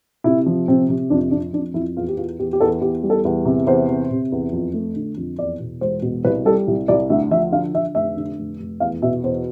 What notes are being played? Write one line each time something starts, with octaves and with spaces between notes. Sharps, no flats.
C3 E4
F3
C3 C4
C3
F2 D4
F2 D4
F2 D4
F2 E4
E2 F4
G4
E2 F4
E2 G4
G4
E2 A4
E2 G4
G3
A4
E2
C3
E2 C5
C3
C3
E2
F2
A3
D3
F2
E2 D5
B2
E1 C5
B2
C2 B4
G3 A4
C2
C2 D5
D2 E5
F3 E5
D3 F5
D3 E5
F1 E5
D3
F1
F1
E2 F5
B2 E5
E2 C5